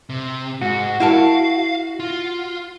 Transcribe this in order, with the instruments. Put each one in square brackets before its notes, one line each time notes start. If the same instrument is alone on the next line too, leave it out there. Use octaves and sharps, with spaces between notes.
[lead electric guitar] C3
[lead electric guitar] G#2 [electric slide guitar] F#4
[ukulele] E4 A#4 A5 [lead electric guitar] F5
[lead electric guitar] F4